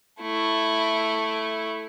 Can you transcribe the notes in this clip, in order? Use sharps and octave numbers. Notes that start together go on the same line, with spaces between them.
A3 E4